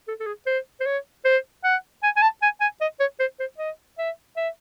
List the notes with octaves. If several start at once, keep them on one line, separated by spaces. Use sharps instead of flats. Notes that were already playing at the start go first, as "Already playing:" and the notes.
A4
A4
G#4
C5
C5
C#5
C5
F#5
G#5
G#5
A5
G#5
G#5
D#5
C#5
C5
C5
D#5
E5
E5